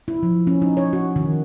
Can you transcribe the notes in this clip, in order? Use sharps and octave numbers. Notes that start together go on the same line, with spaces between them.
E4
F3
C#4
D#4
C#5
F#4
D#3